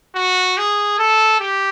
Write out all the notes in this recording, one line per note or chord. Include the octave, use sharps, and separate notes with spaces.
F#4
G#4
A4
G4